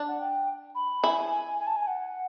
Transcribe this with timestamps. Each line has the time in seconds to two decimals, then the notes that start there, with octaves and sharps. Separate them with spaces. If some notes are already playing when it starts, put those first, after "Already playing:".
Already playing: D4
0.08 F#5
0.19 G5
0.75 B5
1.03 E4 G#5
1.31 G#5
1.59 G#5
1.67 A5
1.76 G#5
1.87 F#5